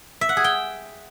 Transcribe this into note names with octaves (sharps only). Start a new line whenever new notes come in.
E5
F#5
G#4
G5